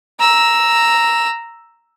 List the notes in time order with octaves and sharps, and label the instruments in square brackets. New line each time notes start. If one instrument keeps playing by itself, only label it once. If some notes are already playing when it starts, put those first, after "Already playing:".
[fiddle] A#5 E6